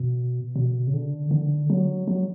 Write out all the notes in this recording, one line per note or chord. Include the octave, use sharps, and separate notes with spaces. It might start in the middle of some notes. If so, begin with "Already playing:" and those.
Already playing: B2
B2
C#3
D3
D3
F#3
F#3